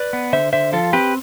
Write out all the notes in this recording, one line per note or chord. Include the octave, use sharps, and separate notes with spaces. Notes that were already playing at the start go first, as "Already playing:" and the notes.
Already playing: B4 D5
B3
D3 C5 E5
D3 C5 E5
F3 F4 A4
C4 G4 B4